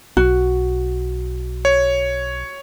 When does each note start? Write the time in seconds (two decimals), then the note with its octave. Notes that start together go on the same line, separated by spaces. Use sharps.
0.17 B1 F#4
1.65 C#5